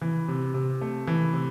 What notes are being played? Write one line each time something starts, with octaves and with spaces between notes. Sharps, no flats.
E3
C3
C3
A3
E3
C3